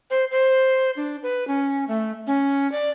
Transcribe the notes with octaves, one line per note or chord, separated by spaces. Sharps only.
C5
C5
D4
B4
C#4
A3
C#4
D5